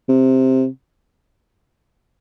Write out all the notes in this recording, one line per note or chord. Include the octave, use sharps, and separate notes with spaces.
C3